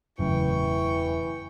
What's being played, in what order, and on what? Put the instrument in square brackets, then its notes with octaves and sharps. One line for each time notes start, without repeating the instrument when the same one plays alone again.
[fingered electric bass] E1 [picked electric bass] F#2 A2 C#3 [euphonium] E3 [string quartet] G5 C#6